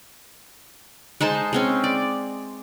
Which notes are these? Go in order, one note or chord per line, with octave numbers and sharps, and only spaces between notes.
G#3 D#4 C5 A5
G#3 C4 C#4
D5